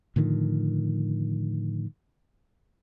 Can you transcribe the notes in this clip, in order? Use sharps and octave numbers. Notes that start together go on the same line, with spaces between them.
A2 D3 D#3 F3